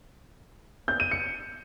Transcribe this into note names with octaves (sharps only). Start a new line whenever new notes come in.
G6
D#7
C#7